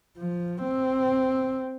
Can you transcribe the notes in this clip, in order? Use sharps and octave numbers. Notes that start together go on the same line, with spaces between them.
F3
C4